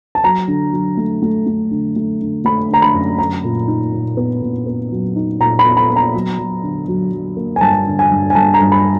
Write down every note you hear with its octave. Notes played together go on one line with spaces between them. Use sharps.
A5
F#3 A#5
D3
F#3
A3
A3
A3
D3
A3
D3
A3 B5
D3 A#5
B5
F#2
F#3 A#5
A#2
D#4
A#2
B3
A#2
B3
F#3
D#4
A#2 A#5
B5
B3
B5
B3
A#5
F#3
F#3
D3
F#3
F#3
A#3
G#5
G2 A5
D3
G#5
G2
G#5
G2 A5
A#5
G2
B5